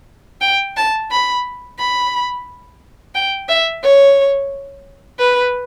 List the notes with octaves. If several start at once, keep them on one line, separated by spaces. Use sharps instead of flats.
G5
A5
B5
B5
G5
E5
C#5
B4